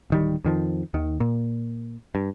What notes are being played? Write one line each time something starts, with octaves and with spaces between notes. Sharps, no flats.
D1 D#3 G3
F2 D#3 F3
D#2 D#3
A#2
G2